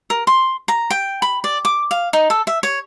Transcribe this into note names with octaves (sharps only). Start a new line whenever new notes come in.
A#4
C6
A#5
G5
B5
D5
D6
F5
D#4
A4
E5
C#5